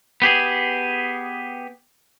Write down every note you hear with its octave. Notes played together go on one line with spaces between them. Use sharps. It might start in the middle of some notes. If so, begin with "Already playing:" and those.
B3 G4 G#4